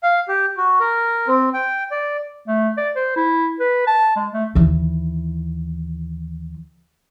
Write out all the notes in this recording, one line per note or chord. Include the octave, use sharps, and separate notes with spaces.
F5
G4
F#4
A#4
C4
G5
D5
A3
D5
C5
E4
B4
A5
G#3
A3
D#2 E3